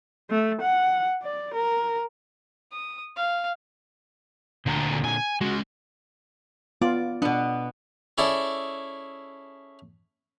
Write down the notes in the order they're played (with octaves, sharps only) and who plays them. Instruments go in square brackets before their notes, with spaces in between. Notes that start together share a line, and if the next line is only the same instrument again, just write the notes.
[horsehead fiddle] A3
F#5
D5
A#4
[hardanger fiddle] D#6
F5
[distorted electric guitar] D2 [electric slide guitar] A#2 D3 A#5
[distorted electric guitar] G#5
[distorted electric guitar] G#3 C#4 [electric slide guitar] F#4
[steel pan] B3 F4 [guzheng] D5
[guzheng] B2 B3 [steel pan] D4
[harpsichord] C#4 E4 G#4 A4 D5